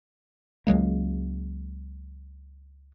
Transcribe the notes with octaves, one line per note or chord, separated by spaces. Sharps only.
C#2 F#3 G#3 A#3